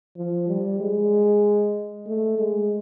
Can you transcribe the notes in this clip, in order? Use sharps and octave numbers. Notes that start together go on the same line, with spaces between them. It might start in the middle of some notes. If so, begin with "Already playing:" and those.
F3
G3
G#3
A3
G#3